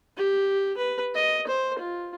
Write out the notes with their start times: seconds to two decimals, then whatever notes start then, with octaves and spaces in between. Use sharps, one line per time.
0.17 G4
0.77 B4
1.15 D#5
1.47 C5
1.78 F4